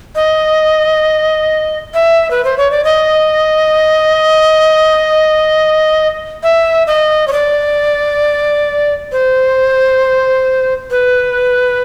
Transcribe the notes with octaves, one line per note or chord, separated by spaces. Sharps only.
D#5
E5
B4
C5
C#5
D5
D#5
E5
D#5
C#5
D5
C5
B4